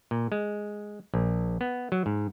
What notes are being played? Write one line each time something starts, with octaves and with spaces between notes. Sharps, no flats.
A#2
G#3
A#1
B3
F#3
G#2